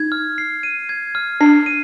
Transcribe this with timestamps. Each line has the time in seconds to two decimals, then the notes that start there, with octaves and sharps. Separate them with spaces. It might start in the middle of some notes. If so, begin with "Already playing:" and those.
Already playing: D#4 G#6
0.12 F6
0.38 C7
0.63 D#7
0.89 G#6
1.15 F6
1.41 D4 C7
1.66 D#7